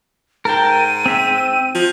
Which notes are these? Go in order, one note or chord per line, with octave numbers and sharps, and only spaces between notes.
G#2 A#4 G5 A5
D#7
C4 E5
F3